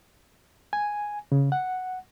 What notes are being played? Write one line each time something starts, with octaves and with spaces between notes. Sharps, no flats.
G#5
C#3
F#5